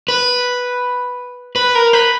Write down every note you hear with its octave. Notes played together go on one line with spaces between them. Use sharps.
B4
B4
A#4
B4